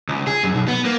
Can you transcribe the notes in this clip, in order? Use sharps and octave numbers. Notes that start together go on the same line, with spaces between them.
C#2
G#4
F#2
B1
B3
A#3